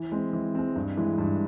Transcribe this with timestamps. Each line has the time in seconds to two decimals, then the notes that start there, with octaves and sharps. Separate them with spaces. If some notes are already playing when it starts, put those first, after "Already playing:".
Already playing: E3
0.12 G#3 C4
0.33 E3
0.55 G#3 C4
0.76 G2
0.97 E3 G#3
1.18 G2